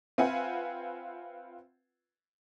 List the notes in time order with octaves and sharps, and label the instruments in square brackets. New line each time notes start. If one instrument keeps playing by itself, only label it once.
[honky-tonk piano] C4 F4 B4 E5 F#5 G#5